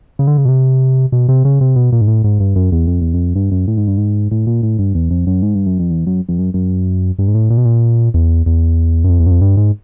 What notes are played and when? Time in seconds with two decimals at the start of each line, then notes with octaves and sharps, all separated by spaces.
0.19 C#3
0.27 D3
0.38 C#3
0.45 B2
0.49 C3
1.12 B2
1.29 C3
1.45 C#3
1.61 C3
1.76 B2
1.92 A#2
2.01 G#2
2.08 A2
2.24 G#2
2.40 G2
2.56 F#2
2.72 E2
2.87 F2
3.01 E2
3.14 F2
3.36 G2
3.51 F#2
3.68 A2
3.77 G#2
3.87 G2
3.98 G#2
4.31 A2
4.47 A#2
4.63 A2
4.79 G2
4.95 E2
5.11 F2
5.27 F#2
5.42 G#2
5.55 G2
5.66 F#2
5.79 F2
5.90 E2
6.07 F#2
6.29 F2
6.39 F#2
6.54 F#2
7.19 G2
7.28 G#2
7.35 A2
7.50 A#2
7.58 B2
7.65 A#2
8.14 E2
8.46 E2
9.04 F#2
9.09 F2
9.20 E2
9.27 F#2
9.31 F2
9.41 G2
9.57 G#2